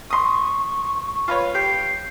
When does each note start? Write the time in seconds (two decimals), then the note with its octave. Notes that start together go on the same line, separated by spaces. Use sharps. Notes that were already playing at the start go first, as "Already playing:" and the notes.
0.10 C6 C#6 D#6
1.28 F4 B4 C#5
1.55 G4 C7